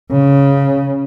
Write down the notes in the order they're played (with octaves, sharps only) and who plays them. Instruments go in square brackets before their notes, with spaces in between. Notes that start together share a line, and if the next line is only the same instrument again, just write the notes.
[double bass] C#3